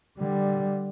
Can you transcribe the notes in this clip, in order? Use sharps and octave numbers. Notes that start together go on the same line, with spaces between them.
D3 G3